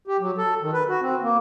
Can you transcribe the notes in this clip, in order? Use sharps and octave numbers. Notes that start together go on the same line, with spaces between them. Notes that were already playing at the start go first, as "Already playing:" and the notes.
G4
F#3
A4
D#3
B4
F#4
C4
A#3